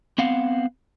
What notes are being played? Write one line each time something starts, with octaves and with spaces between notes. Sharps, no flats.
B3 C4 F5 F#5